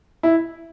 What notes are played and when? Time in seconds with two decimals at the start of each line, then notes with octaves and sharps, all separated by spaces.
0.23 E4